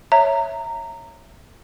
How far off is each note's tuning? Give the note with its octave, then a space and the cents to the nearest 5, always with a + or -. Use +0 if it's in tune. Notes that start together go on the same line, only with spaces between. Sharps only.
C#5 +0 E5 +0 A#5 -15